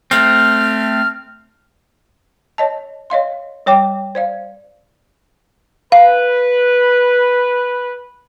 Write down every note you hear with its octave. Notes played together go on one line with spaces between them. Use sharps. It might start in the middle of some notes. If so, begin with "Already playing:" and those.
A3 C4 F6
C#5 D#5 A5
C#5 D#5 F5 C6
G3 C#5 G5 D6
C5 D5 F5
B4 F5